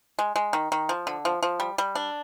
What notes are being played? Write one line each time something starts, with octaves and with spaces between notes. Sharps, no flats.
G#3
G#3
D#3
D#3
F3
D3
F3
F3
G3
G3
D4